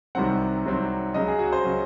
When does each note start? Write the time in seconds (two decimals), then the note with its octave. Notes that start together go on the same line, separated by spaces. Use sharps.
0.15 C2 C3 D#3 F#3 C4 F#5
0.65 C2 C3 D#3 F#3 C4
1.14 C#2 C#3 F#3 D#5
1.28 G#4
1.39 F#4
1.52 C5
1.64 C#3 F#3